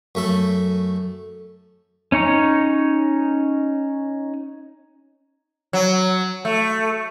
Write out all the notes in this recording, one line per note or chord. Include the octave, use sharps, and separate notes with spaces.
F#2 A3 A4
C#4 D#4 C#5 A#5
F#3
A3